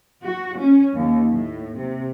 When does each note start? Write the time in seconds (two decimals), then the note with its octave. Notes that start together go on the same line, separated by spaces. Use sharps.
0.22 F#4
0.59 C#4
0.94 D#2
1.31 A2
1.79 C3